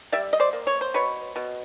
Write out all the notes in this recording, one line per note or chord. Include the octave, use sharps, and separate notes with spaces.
G3 D5 E5
D#5
C5 D5
A#3
C#5
C5
B2 B4 C#5
B2